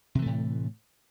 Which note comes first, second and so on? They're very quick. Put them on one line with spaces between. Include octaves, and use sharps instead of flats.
C3 E3 A3 A2